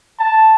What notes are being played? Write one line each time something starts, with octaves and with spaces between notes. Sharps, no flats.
A5